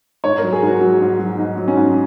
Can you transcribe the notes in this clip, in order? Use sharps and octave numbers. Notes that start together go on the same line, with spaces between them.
G#2 C#5
A#4
F#3
G#4
G#2
F#4
F#3
G#2
F#3
G#2 D#4
F#3
C#4
G#2